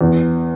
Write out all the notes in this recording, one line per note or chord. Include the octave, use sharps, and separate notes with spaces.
E2